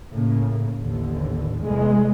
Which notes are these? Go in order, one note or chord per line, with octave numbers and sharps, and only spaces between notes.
A2 C#3 A#3
A1 D#2 D3
F1 E2 G#3 A3